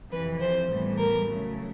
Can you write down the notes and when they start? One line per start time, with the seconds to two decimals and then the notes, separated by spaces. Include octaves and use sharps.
0.12 F2 C3 E3 B4
0.41 C5
0.70 A2 E3 G3 B3
0.98 A#4
1.27 C#3 F#3 A3